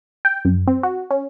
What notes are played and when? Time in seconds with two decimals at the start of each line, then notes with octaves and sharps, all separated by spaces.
0.25 G5
0.45 F#2
0.68 C4
0.83 F#4
1.11 C#4